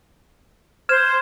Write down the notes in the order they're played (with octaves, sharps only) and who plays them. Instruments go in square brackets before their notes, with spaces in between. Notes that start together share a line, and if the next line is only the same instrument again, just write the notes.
[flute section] C5 [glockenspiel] F6 G#6 E7